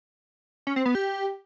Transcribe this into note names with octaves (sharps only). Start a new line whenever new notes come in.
C#4
C4
B3
G4